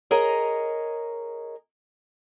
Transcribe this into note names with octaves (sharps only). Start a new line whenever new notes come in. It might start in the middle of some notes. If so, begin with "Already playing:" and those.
G#4 A#4 C#5 D#5 A#5